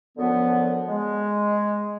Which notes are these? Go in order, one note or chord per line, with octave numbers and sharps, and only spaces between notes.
F#2 D3 F3 B3
G#3